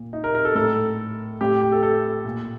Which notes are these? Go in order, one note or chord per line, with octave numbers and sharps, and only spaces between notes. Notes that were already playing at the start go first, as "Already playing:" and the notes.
Already playing: A#2
D#4
A#4
A#4
A4
A2 A4
A2 G4
G4
A4
A4
A#2